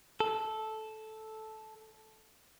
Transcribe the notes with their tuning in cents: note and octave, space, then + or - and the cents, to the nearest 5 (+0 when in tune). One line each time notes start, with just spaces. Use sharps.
A4 -10